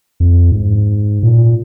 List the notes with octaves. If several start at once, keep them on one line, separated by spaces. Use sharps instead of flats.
F2
G#2
A#2